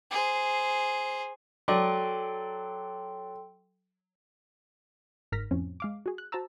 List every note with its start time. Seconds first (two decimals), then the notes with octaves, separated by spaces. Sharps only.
0.11 G#4 C5
1.68 F#3 A4 D5 G5 C6
5.32 G1 G#2 A#4 F6 A#6 B6
5.51 F2 A2 F3 C4 C#4
5.80 G#3 F5 D6
6.06 F#4 G#4
6.18 F#6
6.32 F#4 C5 A5 A#5 E6